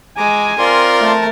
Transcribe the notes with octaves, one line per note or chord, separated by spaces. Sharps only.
G#3 G#5 A#5 D6
C4 F4 A#4 D5 C6
A3 A5